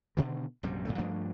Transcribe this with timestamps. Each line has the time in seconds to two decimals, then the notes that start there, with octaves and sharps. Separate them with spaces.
0.17 B2 D3 D#3
0.63 A#1 F#2 C3 G3
0.85 F#2 A#2 D#3 A3
0.98 G2 F3 A3 D4